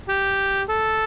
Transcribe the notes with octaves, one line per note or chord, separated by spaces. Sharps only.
G4
A4